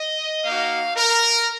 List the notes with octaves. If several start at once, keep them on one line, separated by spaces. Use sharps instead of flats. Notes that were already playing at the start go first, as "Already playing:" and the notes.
Already playing: D#5
A#3 D#4 F#4 F5
A#4